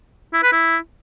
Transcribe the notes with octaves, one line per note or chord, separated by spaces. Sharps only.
E4
B4
E4